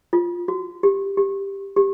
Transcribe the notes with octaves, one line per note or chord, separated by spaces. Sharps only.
F4
F#4
G4
G4
G4